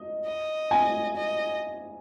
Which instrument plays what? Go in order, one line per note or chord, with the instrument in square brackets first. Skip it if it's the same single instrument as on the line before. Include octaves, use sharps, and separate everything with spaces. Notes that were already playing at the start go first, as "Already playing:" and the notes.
Already playing: [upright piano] D#5
[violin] D#5
[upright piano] G#5
[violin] D#5